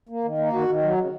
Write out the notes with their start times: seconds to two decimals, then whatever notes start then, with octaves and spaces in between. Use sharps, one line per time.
0.09 A#3
0.24 D#3
0.38 A#3
0.53 D#3 F#4
0.68 D#3
0.83 F#3
0.98 C#3